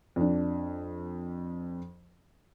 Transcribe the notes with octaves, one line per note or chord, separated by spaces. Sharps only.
F2 D4